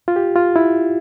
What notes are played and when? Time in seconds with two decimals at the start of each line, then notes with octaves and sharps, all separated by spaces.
0.08 F4
0.16 G4
0.36 F4
0.56 E4